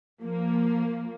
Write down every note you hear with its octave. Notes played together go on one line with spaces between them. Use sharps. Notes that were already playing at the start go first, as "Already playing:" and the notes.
F3 A#3